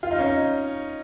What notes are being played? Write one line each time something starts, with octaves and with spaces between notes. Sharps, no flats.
F4
D#4
C#4
D#4